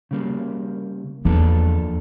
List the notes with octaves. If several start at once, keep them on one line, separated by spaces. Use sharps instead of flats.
C#3 G3 A#3
E2 F3 A#3 D4 F4 A4